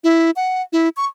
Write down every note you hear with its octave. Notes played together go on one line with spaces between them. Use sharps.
E4
F#5
E4
C#6